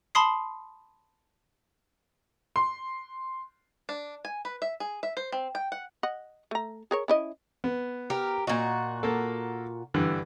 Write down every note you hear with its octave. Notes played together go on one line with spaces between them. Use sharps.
A5 B5 C6 D#6 C7
C6
D4
G#5
B4
E5
G#4
E5
C5
C4
G5
F#5
D#5 F#5
A3 A#5
G#4 A#4 C#5
C#4 E4 D#5
B3
G4 A#4
A#2 F#4 D#5
A#3 A4
G2 D3 E3